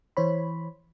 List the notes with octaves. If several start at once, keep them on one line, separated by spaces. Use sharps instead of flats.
E3 C5 C#5 B5